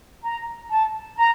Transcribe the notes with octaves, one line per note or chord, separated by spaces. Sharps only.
A#5
A5
A#5